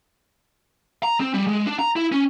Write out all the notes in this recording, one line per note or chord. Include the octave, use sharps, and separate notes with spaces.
A#5
C4
G3
G#3
D4
A#5
E4
C#4